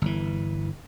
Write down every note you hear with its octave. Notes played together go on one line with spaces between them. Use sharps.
G1 E3